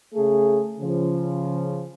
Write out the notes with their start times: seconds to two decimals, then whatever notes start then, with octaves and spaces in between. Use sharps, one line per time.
0.15 C#3 A3 G#4
0.80 C#3 F3